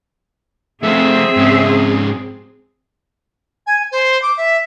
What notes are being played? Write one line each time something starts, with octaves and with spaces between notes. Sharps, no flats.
F3 A3 C4 G#4 E5
G#2 C#4
G#5
C5
D6
E5